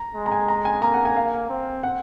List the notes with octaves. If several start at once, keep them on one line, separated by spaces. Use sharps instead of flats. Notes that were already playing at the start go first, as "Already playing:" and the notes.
Already playing: A#5
G#3
A#5
G#5
A#5
G#5
A#3 A#5
F#5
G#5
F5
C4
F#5